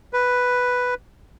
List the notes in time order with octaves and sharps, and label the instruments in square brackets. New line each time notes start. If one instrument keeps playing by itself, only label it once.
[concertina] B4